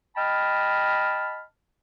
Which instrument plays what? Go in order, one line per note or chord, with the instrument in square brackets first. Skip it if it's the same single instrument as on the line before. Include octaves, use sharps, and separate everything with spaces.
[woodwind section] D#5 G5 A5 B5 F6